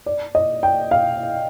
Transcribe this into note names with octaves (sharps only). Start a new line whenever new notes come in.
D5
D#5
G5
F5